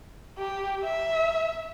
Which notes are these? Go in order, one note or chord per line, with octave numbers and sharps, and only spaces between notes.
G4
E5